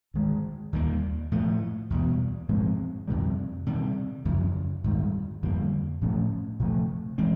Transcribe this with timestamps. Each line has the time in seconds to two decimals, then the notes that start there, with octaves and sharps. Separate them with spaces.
0.14 G#2 D#3 G#3
0.73 D#2 D#3 G3 A#3
1.32 A2 F3 A3
1.90 E2 B2 G3
2.49 G#2 F3 G#3 C4
3.07 F2 C3 D#3 G3
3.66 C3 D#3 G3
4.25 F#2 C#3 F3
4.84 G#2 D#3 G3
5.42 F2 D3 G3 A#3
6.01 A2 F3 A3 C#4
6.60 C3 F3 A3
7.18 E3 G#3 C4